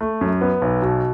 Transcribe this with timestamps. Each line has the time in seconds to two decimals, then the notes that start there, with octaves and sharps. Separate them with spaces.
0.01 A3
0.21 F#2
0.41 B3
0.62 B1
0.82 B2